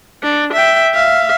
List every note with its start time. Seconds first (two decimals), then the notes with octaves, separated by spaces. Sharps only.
0.23 D4
0.54 E5 G5
0.94 E5 F5